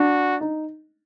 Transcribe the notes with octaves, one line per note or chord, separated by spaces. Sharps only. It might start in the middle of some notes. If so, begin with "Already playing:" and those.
Already playing: D4 F#4
D#4